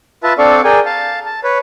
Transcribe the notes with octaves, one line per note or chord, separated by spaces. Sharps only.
F4 B4 E5 A5
C4 D4 A4 D5 F5 C#6
G#4 A#4 D5 G5 G#5
F5 A5
A5
B4 C#5